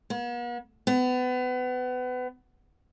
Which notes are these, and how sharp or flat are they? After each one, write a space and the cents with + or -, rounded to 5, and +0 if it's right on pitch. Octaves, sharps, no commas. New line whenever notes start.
B3 -45
B3 +30